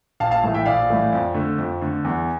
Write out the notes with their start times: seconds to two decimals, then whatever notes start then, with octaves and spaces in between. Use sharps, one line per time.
0.20 A#1 F5 A5
0.31 F5 A5
0.43 A2 E3 A3
0.54 E5 G5
0.66 A#1 D5 F5
0.89 A2 E3 A3
1.13 F2
1.34 D3 A3
1.58 F2
1.82 D3 A3
2.05 E2